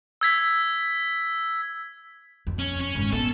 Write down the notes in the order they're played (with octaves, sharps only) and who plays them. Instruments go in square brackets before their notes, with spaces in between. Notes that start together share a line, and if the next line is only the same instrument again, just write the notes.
[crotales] E6 G#6 B6
[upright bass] F2
[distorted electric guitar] C#4
C#4
[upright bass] G#1 G#2
[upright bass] B3 [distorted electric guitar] A4